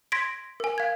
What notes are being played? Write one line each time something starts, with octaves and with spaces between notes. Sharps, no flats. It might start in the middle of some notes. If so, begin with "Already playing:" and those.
C6 G#6 A#6 B6 D7
A#4 G#5
F5 G#6